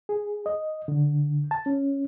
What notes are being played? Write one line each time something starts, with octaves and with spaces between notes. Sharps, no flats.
G#4
D#5
D3
A5
C#4